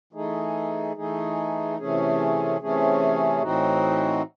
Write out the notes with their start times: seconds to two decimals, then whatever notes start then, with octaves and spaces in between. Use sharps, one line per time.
0.13 E3 A3 D#4 G#4
0.96 E3 A3 D#4 G#4
1.78 C3 E3 A3 C#4 G#4
2.61 C3 E3 A3 C#4 G#4
3.42 A2 E3 C4 D#4 F#4